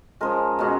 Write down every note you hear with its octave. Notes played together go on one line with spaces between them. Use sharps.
C#3 F3 G#3 A#4
B2 G#3 C#4